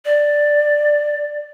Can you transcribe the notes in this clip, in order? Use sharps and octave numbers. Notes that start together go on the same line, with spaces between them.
D5